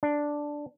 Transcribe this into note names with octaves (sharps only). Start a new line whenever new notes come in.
D4